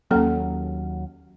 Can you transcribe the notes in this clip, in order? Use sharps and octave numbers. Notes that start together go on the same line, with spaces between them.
D#2 F#3 A#3 C#4 A4